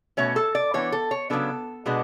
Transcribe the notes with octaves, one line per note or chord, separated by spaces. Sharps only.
B2 A3 C#4 C#5
A4
D5
E3 B3 D4 C#5
A4
C#5
C#3 F#3 B3 D4 A4
B2 G#3 B3 D4